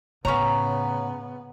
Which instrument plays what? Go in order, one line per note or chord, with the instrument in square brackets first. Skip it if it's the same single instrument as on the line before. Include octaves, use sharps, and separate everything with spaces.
[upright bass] A2 [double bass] C#3 B3 [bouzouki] C#4 A#5 [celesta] C#5 C#6